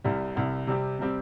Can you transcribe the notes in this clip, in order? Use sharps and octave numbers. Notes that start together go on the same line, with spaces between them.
C2 C3 G3
C2 C3 G3
C3 G3 C4 G4
C3 G3 C4 G4